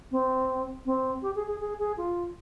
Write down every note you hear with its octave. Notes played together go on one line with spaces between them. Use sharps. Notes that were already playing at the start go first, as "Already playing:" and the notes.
C4
C4
G4
G#4
G#4
G#4
G#4
F4